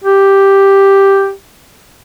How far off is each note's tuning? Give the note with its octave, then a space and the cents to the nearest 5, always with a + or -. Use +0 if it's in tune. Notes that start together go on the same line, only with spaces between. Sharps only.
G4 +0